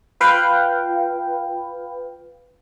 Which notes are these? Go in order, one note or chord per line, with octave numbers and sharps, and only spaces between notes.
F4 B4 F5 G5